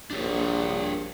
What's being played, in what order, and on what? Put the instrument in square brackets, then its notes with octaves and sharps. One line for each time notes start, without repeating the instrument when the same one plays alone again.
[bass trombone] A#1 [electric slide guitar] D4 G4 C#5